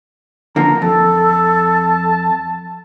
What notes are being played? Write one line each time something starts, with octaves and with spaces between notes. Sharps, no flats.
D3 F3 A#3 A#5
F2 A4 A5